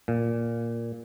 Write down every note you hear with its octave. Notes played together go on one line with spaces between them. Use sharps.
A#2